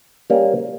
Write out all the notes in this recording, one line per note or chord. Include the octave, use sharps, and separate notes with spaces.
G3 A#3 C#4